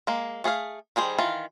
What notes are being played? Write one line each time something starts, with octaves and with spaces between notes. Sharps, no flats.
G#3 A#3
A3 G#4 C5 F5
D#3 G3 G#4 C5
D#3 E3 F4